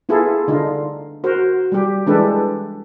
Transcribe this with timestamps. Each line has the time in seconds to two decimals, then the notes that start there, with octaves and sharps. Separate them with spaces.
0.09 B3 E4 F4 G#4 A4
0.48 D3 D#4 F4
1.24 F#4 A#4 C5
1.72 G3 G4
2.07 E3 G#3 D4 G4 A4 B4